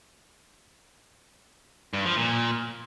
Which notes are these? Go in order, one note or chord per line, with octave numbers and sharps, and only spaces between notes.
G2
F3
A#2